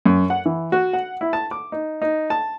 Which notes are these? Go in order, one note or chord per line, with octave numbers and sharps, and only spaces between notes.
F#2
F#5
E3
F#4
F#5
E4
A5
D6
D#4
D#4
A5